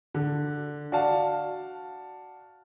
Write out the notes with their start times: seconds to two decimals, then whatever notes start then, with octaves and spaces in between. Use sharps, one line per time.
0.15 D3
0.92 F#4 D5 F5 A5